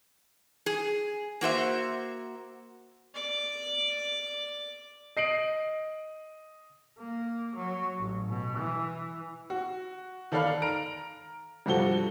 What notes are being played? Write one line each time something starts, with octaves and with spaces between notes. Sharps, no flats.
G#4
A#3 F#4 C5 E5
D5 D6
D#5 C7 D7 F#7
A#3
F#3
A1
B2
E3
F#4
D#3 A4 D5 F5 B5 F6
A#5 F6 D7
G2 C3 F3 F#4 A4 G7